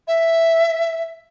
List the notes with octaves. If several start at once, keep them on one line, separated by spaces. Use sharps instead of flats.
E5